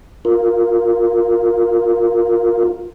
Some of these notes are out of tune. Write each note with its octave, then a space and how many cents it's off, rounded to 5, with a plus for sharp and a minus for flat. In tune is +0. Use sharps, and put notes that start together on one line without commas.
F4 +0 A#4 +0